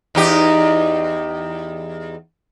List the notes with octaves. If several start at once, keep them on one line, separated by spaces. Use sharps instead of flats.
E2 D#4 G4